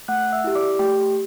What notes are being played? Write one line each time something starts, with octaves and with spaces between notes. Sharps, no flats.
A3 F#5 F#6
E5 E6
E4 G4
D5 D6
A3 G4 G5